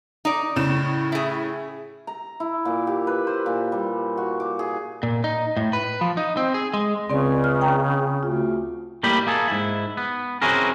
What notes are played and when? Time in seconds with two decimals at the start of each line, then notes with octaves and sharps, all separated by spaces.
0.25 D#4 D5
0.56 A2 C#3 E7
1.12 E4 G#4
2.07 A#5
2.40 E4
2.65 A#2
2.87 G4
3.07 B4
3.27 C5
3.46 A#2
3.72 G3
4.17 F#4
4.40 D6
4.59 G#4
5.03 A#2
5.24 D#4
5.57 A2
5.73 B4
6.01 F3
6.17 D#4
6.37 C4
6.54 G#4
6.74 G#3
7.10 C#2 C#3 C4 D5
7.44 F6
7.61 G5 A#5
8.23 D2 F4
9.03 A2 G3 A#3 D#4 G4 B5
9.27 A#3 G#4 A4
9.47 G#2 E4
9.97 B3
10.42 C4 C#4 E4 F#4 G#4 A#4